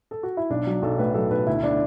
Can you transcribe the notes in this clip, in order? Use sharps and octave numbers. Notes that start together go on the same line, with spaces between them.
A4
F#4
E4
B1 D4
F#3
B1 A4
A2 B4
F#3 A4
B1 B4
D2 E4
D3 D4